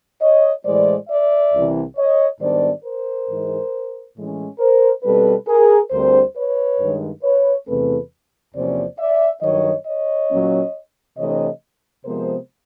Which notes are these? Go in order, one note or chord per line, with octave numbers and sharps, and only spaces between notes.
C#5 D#5
A2 E3 G#3 C5 D5
D5 E5
C2 C3 E3
C#5 D#5
G#2 D#3 G3 B3 D4 C5 D5
A#4 C5
G#2 E3 G#3
A2 E3 G#3 C#4
A#4 C5
B2 G3 C4 A4 B4
G#4 A#4
D2 D3 G3 C4 A#4 C5
B4 C#5
G2 D#3 G#3
B4 C#5
E2 C3 E3 A3 C4 A4 B4
E2 C3 F3 A#3 C#4 C5 D5
D5 E5
G2 D#3 F#3 C#5 D#5
C#5 D#5
A#2 F#3 A#3 C#4
C3 E3 A3 D4 C#5 D#5
C3 F3 G#3 B3 A#4 C5